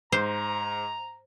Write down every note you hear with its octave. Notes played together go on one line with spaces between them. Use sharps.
G#2 C5 A#5